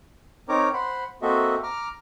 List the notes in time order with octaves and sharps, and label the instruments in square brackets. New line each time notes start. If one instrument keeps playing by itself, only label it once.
[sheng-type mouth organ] C4 D#4 A#4 C#5 A#5 D6
C5 F#5 B5 C6
A#3 C4 F#4 A4 D#5 E5
A#5 D6 F6